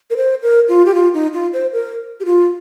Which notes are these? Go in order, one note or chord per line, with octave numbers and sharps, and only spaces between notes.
A#4
C5
A#4
F4
G4
F4
D#4
F4
C5
A#4
G4
F4